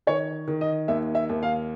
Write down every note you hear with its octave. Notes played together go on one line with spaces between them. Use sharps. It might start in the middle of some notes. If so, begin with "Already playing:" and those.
D#3 C#5
D#3
D#5
D#2 E5
E5
D#2
F5